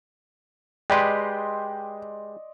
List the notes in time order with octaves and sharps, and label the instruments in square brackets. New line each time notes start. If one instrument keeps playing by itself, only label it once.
[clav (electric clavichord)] G#3 G4 B4 [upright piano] D5 D#5 C6 [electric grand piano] G5